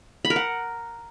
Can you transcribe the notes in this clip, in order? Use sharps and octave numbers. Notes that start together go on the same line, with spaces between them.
B5
A#4
F#5